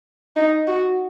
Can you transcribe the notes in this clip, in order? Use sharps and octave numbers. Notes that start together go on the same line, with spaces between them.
D#4
F#4